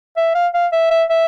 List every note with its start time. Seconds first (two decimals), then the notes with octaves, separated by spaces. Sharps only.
0.17 E5
0.35 F5
0.54 F5
0.73 E5
0.91 E5
1.09 E5